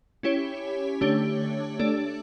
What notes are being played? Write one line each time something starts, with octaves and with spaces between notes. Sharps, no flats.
C#4 E4 G4 C#5
D3 A3 D4 G4 C#5
A3 D4 A4 D5